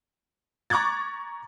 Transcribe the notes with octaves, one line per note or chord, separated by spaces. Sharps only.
A#5 C#6 D6 F#6 G#6 A6